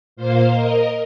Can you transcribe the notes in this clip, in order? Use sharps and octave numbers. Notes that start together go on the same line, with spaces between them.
A#2 A#3 C5 F5
A#4 D#5